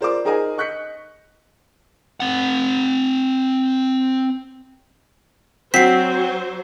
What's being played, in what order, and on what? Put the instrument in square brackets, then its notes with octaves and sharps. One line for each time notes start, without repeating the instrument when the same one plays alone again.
[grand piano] F4 A#4 C5 D5 C6 D6
D#4 G#4 A#4 C5 D#5 G#5
D#5 C#6 F#6 G6 B6 C#7
[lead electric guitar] C4 F#5
[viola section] F#3 C5 [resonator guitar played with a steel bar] C4 [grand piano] F#4 [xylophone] B6 C7